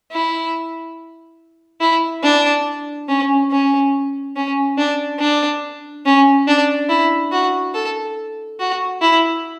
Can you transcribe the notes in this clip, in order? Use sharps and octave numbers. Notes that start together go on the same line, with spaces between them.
E4
E4
D4
C#4
C#4
C#4
D4
D4
C#4
D4
E4
F#4
A4
F#4
E4